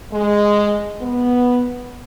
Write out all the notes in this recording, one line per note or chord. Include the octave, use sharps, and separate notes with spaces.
G#3
B3